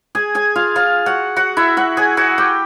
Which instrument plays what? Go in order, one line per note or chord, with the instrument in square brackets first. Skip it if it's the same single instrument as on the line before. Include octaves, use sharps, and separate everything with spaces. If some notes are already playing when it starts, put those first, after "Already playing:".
[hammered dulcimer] G#4 G#5
G#4 G#5
F4 F5
F4 F5
F#4 F#5
F#4 F#5
E4 E5
F#4 F#5
G#4 G#5
F#4 F#5
G4 G5